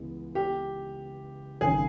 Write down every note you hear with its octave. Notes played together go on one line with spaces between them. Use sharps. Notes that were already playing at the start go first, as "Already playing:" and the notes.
Already playing: C#2 C#3 E3 G#3 B3
G4
G#1 F#2 C#3 G#4